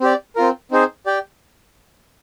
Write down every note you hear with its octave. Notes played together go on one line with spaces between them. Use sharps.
C4 G4 D5
C4 F4 A#4
C4 D#4 G#4 C5
G4 D5 G5